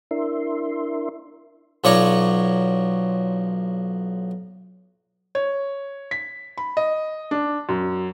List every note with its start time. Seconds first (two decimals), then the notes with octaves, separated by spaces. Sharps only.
0.11 D4 E4 A#4 E5 C6
1.84 B1 F3 C#5 D5 A#5 C#6
5.35 C#5
6.11 B6
6.58 B5
6.77 D#5
7.31 D4
7.69 F#2